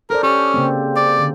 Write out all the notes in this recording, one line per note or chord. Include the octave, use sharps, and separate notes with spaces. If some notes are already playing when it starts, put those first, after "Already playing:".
A4 A#4 C5 D5
C#4 G4
C#3 A#3 C4
D5
D3